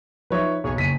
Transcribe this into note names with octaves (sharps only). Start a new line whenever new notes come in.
F3 F#3 D#4 B4 C#5 E5
B1 G#4 C#5
F#1 B6 D#7